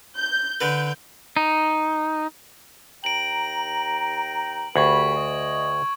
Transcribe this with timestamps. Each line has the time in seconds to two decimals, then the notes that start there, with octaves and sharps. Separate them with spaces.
0.18 G6
0.61 D3 B4 G6
1.37 D#4
3.04 D#2 G5 A#5 D7 F#7
4.76 D2 G4 A#4 B5 C#6 G#6 F#7
5.16 D#5